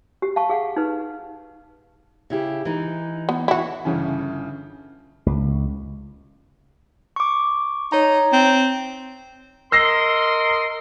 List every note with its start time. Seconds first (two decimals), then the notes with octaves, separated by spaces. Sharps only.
0.22 G4
0.36 F5 A5 C#6
0.49 G#4 F5 F#5
0.76 D#4 B4
2.30 C#3 E4 G4
2.65 E3 D#4
3.29 B3
3.48 E2 E3 E4 F#4
3.85 G1 C#3 E3 C#4
5.26 C#2
7.16 C#6 D6
7.92 D#4 C#5 A#5
8.33 C4
9.72 A#4 D#5 C6 E6 A#6 C7